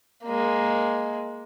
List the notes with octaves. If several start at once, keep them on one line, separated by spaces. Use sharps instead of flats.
G#3 A#3